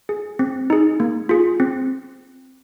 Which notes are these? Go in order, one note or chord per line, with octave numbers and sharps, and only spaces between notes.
G#4
C4
D#4 G#4
A#3
F4 G#4
C4